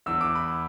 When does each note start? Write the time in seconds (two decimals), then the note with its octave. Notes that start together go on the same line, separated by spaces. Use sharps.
0.06 E2 E3 E6
0.21 D6
0.35 B5